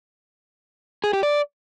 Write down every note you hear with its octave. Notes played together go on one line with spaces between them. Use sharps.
G#4
G4
D5